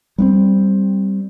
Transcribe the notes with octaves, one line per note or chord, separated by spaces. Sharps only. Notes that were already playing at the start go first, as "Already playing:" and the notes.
G3 B3 C4